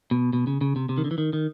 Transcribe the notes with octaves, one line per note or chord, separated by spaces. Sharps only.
B2
B2
C#3
C#3
C3
C3
D#3
D3
E3
D#3
D#3